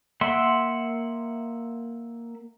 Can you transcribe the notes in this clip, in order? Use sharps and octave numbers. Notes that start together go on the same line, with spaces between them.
A#3 E5 F#5 C6